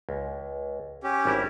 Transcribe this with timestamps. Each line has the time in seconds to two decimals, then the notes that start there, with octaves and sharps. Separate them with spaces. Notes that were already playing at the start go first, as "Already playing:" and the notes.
0.09 C#2
1.03 C#4 G4
1.25 G#1 G3 E4